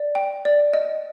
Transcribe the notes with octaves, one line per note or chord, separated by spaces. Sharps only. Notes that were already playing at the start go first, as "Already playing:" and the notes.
Already playing: D5
G5
D5
D#5